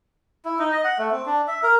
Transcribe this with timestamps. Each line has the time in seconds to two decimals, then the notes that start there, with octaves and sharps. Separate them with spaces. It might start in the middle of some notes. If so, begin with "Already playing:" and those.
0.45 E4
0.59 D#4
0.72 D#5
0.84 F#5
0.98 A3
1.11 C4
1.26 D4
1.48 E5
1.63 A#4